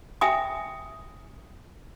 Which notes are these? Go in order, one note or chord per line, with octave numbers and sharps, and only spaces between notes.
E5 G5 G#5 D#6